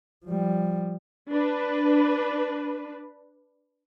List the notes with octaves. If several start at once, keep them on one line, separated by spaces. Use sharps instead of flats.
F3 G3
D4 B4